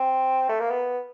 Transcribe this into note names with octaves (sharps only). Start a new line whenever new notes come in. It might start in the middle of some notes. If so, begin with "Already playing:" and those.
Already playing: C4
A3
A#3
B3